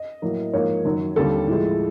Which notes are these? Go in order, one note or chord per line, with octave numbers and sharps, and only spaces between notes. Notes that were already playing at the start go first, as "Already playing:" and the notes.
Already playing: D#5
A2 F#3 A#3
G#2 F3 A#3 C#5
F#2 D#3 F#3
D#2 D3 G3 C4 A4
A2 F3 G#3